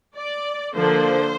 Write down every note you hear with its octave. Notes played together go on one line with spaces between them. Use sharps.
D5
D3 F3 A#3 C5